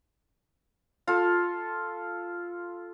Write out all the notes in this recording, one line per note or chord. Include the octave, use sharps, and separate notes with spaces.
F4 A4